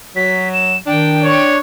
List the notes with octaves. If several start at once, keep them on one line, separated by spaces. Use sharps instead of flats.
F#3 B6
E7
D#3 D4 G5
C#5